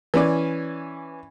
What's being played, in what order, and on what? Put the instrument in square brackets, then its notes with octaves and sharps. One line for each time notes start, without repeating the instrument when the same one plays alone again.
[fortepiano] E3 C#4 D5